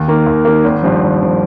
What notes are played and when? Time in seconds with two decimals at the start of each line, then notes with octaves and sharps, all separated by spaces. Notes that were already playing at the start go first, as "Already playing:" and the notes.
Already playing: D#2
0.08 D#3 A#3
0.27 D#2
0.45 D#3 A#3
0.64 G#1
0.83 G2 F3
1.02 G#1
1.22 F3